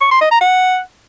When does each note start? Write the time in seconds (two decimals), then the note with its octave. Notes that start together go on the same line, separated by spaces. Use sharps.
0.01 C#6
0.11 C6
0.21 D#5
0.31 A#5
0.41 F#5